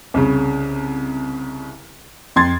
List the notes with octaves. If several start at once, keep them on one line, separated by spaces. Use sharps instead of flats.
C2 C#3
F2 C6 G#6 A6